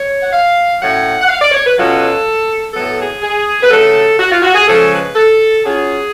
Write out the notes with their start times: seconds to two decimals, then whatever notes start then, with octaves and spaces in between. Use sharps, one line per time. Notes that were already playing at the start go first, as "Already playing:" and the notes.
Already playing: C#5
0.21 F#5
0.31 F5
0.80 A2 F#3 C#4 F#5
1.21 F#5
1.28 F5
1.41 D5
1.52 C#5
1.65 B4
1.76 B2 F#3 C#4 F4 A4
2.73 A2 F#3 B3 A4
2.98 G#4
3.21 G#4
3.62 B4
3.69 C#3 F#3 A3 A4
4.19 F#4
4.31 F4
4.42 F#4
4.54 G#4
4.66 C#3 F3 G#3 C#4 A4
4.90 B4
5.14 A4
5.64 F#3 C#4 F4 G#4